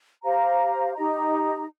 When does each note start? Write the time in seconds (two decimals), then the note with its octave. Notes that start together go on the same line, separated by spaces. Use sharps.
0.23 G4 C5 F5 A#5
0.94 D#4 G4 D#5 A#5